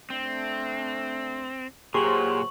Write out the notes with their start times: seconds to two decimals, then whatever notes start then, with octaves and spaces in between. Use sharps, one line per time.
0.10 A3 C4 D4
1.94 A#2 F#3 G4 G#4 C5 C6 C#6 F#7